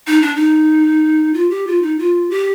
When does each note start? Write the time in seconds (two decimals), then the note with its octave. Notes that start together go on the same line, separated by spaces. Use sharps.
0.07 D#4
0.22 D4
0.36 D#4
1.34 F4
1.50 G4
1.67 F4
1.82 D#4
1.99 F4
2.30 G4